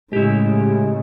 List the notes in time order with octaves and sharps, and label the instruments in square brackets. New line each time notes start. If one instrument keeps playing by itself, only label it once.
[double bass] A2 C#3 [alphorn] G#3 [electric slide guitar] E4 G4